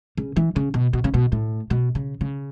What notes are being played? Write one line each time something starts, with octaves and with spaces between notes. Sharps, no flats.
C#3
E3
C#3
B2
B2
C#3
B2
A2
B2
C#3
C#3